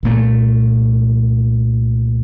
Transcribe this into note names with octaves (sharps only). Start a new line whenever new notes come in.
C2 A#2 A3